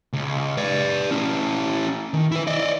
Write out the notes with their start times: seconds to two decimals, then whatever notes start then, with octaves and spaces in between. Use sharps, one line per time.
0.13 C#2
0.57 B4 D5
1.11 C#4 E4
2.14 D#3
2.32 E4 B4
2.47 D5 D#5